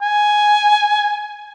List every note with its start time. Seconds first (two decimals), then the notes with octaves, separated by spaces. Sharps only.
0.01 G#5